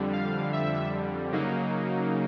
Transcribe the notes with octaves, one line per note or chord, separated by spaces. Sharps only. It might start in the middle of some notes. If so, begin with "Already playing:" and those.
Already playing: F2 D3 G3
F5
E5
C#3 F#3 A#3 D#4